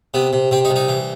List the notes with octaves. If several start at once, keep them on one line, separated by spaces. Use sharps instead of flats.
C3 B3
C3
C3 C4
D#4
C2
D#4
E3